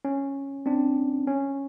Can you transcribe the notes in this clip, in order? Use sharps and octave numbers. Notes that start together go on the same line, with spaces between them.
C#4
C4 D4
C#4